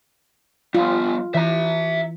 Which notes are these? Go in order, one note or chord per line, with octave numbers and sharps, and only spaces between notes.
G3 B3 F4
E3 E5 A#5